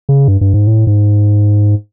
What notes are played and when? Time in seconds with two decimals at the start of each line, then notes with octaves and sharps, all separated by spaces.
0.09 C#3
0.28 G2
0.41 G2
0.54 G#2
0.67 A2
0.87 G#2